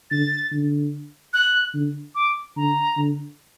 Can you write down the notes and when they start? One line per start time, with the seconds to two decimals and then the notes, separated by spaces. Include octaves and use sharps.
0.11 D3 A6
0.52 D3
1.34 F#6
1.74 D3
2.15 D6
2.57 D3 A#5
2.97 D3